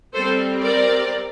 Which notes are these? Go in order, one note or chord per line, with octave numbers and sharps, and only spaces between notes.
G3 C4 A4 C5
A#4 D5